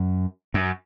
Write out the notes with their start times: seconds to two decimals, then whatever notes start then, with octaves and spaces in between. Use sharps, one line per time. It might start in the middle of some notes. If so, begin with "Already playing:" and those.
Already playing: F#2
0.54 F#2